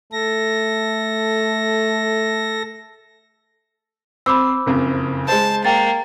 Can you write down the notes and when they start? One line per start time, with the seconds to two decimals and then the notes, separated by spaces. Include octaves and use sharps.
0.12 A3 A4 A#6
4.26 C4 B5 D6 E6
4.66 F#1 F2 C#3
5.28 G#3 C5 A5
5.65 A#3 G5 A6